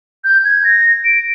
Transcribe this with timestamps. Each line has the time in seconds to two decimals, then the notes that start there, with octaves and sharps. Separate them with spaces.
0.24 G6
0.45 G#6
0.64 A#6
1.05 D7